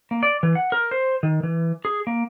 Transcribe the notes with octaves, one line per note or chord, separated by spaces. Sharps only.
A#3
D5
E3
F#5
A#4
C5
D#3
E3
G#4
A#3